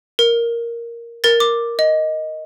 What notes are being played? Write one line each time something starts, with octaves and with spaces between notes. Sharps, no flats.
A#4
A#4 A6
D6
D#5